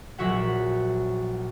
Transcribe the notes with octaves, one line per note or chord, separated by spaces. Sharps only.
A#1 F#3 F#4 E5 F#5